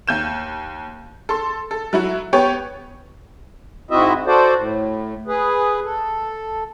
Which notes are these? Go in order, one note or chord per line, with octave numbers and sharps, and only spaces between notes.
D#2 G6 E7
A4 C6
A4
F#3 E4 F#4
B3 G4 C#5
G#2 C4 E4 F#4 D#5 E5
F#4 A4 C5 D5
A2
G#4 B4
A4